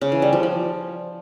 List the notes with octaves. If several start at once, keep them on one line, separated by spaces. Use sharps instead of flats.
C#3
E3
G3
F3
F3